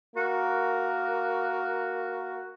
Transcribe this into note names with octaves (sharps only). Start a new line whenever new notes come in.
A#3 F#4 A#4